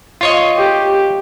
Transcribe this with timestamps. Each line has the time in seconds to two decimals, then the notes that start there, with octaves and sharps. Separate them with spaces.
0.21 F4 C#5 D#5
0.57 G4